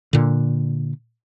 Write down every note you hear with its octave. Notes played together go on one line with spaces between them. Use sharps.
A#2 D3